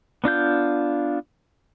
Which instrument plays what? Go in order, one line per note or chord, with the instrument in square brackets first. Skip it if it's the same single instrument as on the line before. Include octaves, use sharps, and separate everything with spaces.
[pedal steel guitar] B3 D4 F4 G6